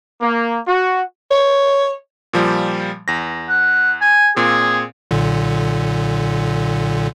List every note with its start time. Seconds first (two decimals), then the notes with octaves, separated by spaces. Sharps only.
0.21 A#3
0.67 F#4
1.31 C#5
2.33 A#2 F3 G3
3.08 E2 A#6
3.49 F#5
4.01 G#5
4.36 A#2 C4 G#4
5.11 B1 A#2 D3